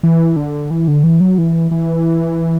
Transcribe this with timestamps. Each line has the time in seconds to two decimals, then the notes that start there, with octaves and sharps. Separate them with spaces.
0.03 E3
0.36 D3
0.71 E3
0.88 D3
1.04 E3
1.20 F#3
1.38 E3
1.71 E3